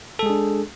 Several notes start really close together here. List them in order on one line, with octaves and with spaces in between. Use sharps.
A4 G#3 G#4 D4